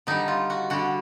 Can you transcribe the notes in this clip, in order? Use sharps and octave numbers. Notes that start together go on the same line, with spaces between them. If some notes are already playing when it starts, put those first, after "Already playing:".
D3 G3 D#4
F4
F#4
D3 G3 F#4